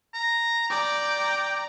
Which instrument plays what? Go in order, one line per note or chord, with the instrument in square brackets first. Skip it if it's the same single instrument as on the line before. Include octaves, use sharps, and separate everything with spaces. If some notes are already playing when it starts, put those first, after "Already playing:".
[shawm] A#5
[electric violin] D5 A#5 [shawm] G5